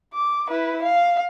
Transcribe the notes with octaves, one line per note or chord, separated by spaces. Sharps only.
D6
E4 B4
F5